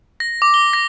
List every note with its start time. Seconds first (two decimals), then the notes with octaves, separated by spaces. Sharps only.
0.20 A#6
0.42 D6
0.54 G7
0.73 A#6